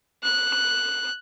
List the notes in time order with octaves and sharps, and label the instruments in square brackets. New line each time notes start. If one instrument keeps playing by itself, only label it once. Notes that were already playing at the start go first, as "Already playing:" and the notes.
[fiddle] F#6